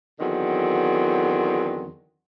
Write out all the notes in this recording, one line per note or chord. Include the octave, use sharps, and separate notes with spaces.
E2 D3 D#3 F#3 C4